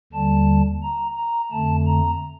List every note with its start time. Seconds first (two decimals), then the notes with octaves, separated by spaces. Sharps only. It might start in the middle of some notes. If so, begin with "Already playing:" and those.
0.13 D#2 D3 G3 A5
0.83 A#5
1.17 A#5
1.52 F2 D3 A3 A5
1.86 A#5